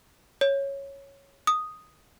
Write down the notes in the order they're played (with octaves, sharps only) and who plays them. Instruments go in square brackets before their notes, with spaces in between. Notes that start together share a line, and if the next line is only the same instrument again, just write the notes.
[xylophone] C#5
D#6